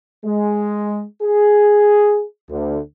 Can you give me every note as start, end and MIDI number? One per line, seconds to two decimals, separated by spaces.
0.25 1.04 56
1.23 2.24 68
2.50 2.79 38